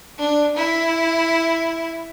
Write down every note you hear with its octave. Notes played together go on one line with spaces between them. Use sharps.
D4
E4